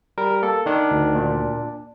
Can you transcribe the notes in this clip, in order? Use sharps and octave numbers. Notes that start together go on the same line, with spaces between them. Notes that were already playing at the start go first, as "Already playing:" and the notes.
G3 A#4
A#3 A4
D#3 D4
D2
A#2